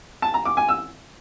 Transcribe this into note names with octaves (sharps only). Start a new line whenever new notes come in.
A5
A#5
D6
G#5
E6